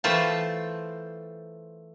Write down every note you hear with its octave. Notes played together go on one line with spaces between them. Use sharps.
E3 A3 F4 C5 G5 A5